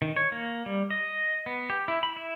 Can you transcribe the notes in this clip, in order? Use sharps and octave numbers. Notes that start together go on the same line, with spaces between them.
D#3
C#5
A#3
G3
D#5
B3
G4
E4
B5
E4